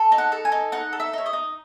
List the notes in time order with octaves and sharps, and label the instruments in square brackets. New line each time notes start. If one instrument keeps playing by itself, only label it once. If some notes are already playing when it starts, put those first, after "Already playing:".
Already playing: [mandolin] A4
D#4
F#5
A4
G#5
D#4
D#4 F#5
A4
E5
D#4 C#5
D#5
D#4